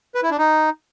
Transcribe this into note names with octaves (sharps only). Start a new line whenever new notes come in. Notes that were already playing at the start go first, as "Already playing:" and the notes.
B4
E4
D4
D#4